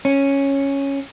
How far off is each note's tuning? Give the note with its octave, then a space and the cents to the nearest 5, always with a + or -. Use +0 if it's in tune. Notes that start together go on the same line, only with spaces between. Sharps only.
C#4 -5